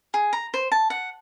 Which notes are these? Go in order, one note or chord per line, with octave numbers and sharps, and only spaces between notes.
G#4
A#5
C5
A5
F#5